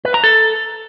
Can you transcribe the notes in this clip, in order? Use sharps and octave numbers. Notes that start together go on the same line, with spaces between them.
B4
A#5
A4